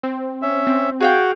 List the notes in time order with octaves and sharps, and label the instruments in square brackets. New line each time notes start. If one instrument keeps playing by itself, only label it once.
[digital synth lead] C4
[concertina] C#4 E5
[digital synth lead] C4
[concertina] F#4 [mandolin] G#4 F5 G5